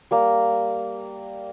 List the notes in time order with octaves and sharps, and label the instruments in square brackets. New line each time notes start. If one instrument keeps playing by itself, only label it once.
[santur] G3 A#3